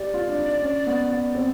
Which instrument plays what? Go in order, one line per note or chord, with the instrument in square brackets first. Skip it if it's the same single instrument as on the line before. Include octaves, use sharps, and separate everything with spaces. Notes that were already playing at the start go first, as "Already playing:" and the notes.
Already playing: [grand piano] G4 [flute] D5
[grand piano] F4
D4
D#4
C#4
B3
B3
C4